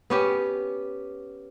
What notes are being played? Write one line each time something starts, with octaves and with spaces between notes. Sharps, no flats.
B3 C#4 G4